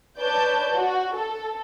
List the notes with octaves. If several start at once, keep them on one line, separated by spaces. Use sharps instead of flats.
B4 C#5 D5 A5 G6
F#4
A4